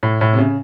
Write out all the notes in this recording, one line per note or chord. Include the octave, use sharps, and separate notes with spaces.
A2
A2
C3
C#3